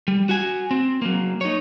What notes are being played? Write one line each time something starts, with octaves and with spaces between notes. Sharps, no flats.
G3
F#4 G#5
C4
F#3 A#3
D#4 C#5